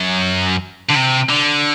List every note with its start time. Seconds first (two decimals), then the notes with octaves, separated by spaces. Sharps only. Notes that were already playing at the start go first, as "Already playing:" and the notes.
Already playing: F#2
0.90 D3
0.96 C3
1.29 D3